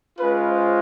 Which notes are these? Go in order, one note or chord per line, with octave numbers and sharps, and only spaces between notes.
G#3 C#4 F4 B4
C5